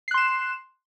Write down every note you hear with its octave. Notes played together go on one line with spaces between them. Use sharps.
C6 F#6 C7 E7